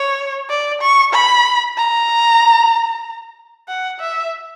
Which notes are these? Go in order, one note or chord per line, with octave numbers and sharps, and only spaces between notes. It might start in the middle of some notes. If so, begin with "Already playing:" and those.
Already playing: C#5
D5
C#6
B5
A#5
F#5
E5